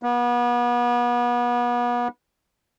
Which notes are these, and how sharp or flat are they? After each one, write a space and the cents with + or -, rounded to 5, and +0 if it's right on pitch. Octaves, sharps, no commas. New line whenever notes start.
B3 -35